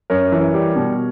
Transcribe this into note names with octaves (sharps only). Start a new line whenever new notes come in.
F#2 A#4 C#5
E3
G3
B2